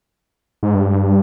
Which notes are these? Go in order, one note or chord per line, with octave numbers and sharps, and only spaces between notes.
G#2
G2